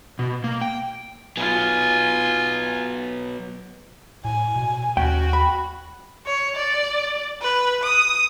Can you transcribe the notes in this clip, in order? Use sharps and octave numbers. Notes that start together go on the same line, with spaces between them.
B2
A#3
G5
F#3 B3 F4 G#5
A2 G#5
B2
D#2 C#4 F#4 G5
B5
C#5
D5
B4
D#6